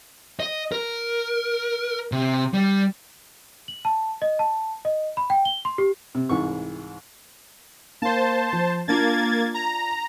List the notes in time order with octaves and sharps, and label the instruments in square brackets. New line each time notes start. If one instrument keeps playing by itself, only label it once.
[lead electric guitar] D#5
A#4
C3
G3
[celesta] F#7
A5
D#5
A5
D#5
B5
G5
G7
C6
G4
[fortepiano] C3
C2 G#2 E3 C#6
[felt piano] A#3 [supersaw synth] C5 A5
[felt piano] F3
[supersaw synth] A#3 G#6 A6 [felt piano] D4 F4
[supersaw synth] A#5